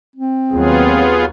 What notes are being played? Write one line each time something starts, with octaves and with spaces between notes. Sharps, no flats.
C4
D#2 F#3 B3 F4 G#4